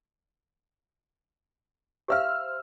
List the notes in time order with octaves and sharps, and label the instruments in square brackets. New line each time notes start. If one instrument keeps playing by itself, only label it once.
[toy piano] G4 E5 F5 [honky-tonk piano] C5 E6 F6